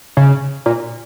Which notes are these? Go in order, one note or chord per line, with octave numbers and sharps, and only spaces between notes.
C#3
A#2